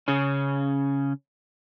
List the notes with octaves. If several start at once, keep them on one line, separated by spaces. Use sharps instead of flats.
C#3 C#4